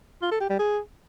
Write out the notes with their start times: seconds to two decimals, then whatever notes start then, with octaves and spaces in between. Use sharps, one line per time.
0.22 F4
0.31 A4
0.41 G4
0.50 G3
0.59 G#4